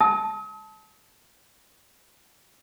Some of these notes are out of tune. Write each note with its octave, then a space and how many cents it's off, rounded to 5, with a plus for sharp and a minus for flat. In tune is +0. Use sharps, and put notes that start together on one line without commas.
A5 -15 D#6 +45